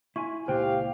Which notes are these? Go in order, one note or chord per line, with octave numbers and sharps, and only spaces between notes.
E4 F4 G#5 C#6
C#2 A#2 E4 G4 C5 F5 G5